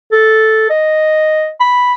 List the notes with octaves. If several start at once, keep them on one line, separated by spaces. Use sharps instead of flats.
A4
D#5
B5